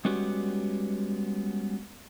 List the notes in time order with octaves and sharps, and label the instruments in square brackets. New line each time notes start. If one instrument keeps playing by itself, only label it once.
[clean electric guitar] G3 G#3 B3 C#4 F#4 G4